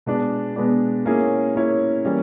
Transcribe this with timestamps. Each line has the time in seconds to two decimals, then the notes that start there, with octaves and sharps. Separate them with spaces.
0.06 B2 G#3 B3 D4
0.56 B2 G#3 B3 D4
1.06 A#3 C#4 E4 G#4 C#5
1.55 A#3 C#4 E4 G#4 C#5
2.05 E3 G3 A#3 C#4